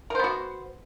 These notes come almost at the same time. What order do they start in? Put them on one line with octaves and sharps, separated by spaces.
A#4 C5 B3 F#4